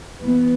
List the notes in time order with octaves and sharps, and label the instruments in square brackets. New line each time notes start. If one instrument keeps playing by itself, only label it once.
[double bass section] E3 B3